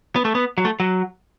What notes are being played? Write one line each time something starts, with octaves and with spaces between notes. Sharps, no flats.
B3
A3
B3
F#3
A3
F#3